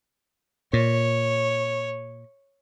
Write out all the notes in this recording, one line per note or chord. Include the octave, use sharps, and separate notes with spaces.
A#2 C#5